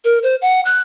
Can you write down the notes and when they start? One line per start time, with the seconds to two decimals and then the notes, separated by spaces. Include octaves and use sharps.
0.05 A#4
0.23 C5
0.42 F#5
0.65 F#6